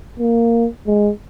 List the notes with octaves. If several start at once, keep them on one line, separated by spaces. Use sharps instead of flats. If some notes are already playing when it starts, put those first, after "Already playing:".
A#3
G#3